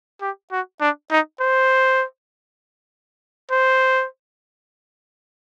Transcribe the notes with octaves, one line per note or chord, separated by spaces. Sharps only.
G4
F#4
D4
D#4
C5
C5